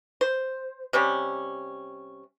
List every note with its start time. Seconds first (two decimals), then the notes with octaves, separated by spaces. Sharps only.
0.21 C5
0.93 C3 G3 C#4